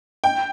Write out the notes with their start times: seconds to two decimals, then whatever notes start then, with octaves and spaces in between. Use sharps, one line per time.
0.24 G5